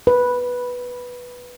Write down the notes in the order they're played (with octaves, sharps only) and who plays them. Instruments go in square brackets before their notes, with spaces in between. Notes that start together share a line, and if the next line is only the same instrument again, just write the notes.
[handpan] B4